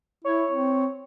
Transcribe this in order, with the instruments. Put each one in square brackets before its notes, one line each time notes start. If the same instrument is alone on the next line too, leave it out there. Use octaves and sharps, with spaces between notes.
[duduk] E4 [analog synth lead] C#5
[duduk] C4